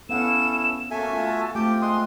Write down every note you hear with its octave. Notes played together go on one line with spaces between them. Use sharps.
B3 C#4 E4 A4 F5 F#5 E7
A#3 C#4 F#4 A4 E5 G#5 A5
A3 F4 F#4
A3 C4 F4 G4 G5
G#3 C6 D#6 F#6